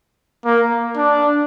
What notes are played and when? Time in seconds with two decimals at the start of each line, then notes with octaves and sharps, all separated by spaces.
0.45 A#3
0.97 D4